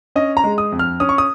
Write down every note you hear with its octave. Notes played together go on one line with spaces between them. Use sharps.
C#4 D#5
A#5
G#3
D#6
F2
F6
C#4 D#6
C#6
D#6